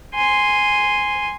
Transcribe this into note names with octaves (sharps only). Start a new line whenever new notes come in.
G#5 C6